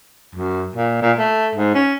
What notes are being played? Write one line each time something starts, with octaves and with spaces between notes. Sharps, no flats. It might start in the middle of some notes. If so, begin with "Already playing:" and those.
F#2
A#2
A#2
A3
G#2
C#4